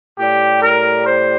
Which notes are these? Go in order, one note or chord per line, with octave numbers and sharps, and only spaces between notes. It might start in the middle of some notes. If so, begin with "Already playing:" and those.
A2 G3 G4
A#4
C5